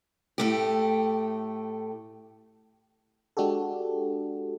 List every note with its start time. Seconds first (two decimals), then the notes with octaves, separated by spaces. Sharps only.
0.38 A2 A3 G4
3.37 G#3 D4 F#4 G4 A4